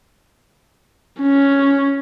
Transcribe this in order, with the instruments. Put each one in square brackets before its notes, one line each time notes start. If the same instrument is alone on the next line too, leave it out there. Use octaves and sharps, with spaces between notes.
[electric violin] C#4